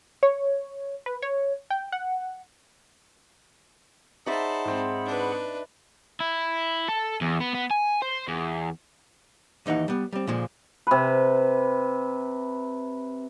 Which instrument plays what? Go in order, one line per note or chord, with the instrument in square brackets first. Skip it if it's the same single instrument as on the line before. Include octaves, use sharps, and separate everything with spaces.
[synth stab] C#5
B4
C#5
G5
F#5
[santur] D#4 D5 E5 [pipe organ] G#4 F#5 B5 [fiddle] C5 A5
[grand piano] G#2 C4
[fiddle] D4 B4
[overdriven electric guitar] E4
A4
E2
B3
B3
G#5
C5
E2
[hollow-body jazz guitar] D#2 E3 D#4 D#5 F#5
G3 B3
G3 C4
A#2 D3 F3 G#3
[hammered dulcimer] C3 B4